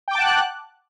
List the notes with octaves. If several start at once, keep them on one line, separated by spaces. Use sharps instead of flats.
F#5 G5 A5 D6 F#6